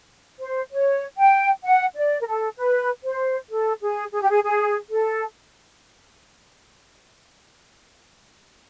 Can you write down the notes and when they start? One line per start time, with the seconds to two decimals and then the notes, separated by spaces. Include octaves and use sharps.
0.39 C5
0.71 C#5
1.17 G5
1.64 F#5
1.95 D5
2.21 A#4
2.26 A4
2.57 B4
3.04 C5
3.50 A4
3.82 G#4
4.12 G#4
4.21 G4
4.30 G#4
4.43 G#4
4.91 A4